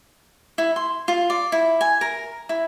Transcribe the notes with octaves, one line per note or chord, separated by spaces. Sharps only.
E4
C6
F4
D5
E4
G#5
A#4
E4